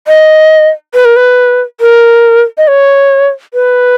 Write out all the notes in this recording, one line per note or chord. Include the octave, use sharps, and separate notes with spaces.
D#5
B4
A#4
B4
A#4
D#5
C#5
B4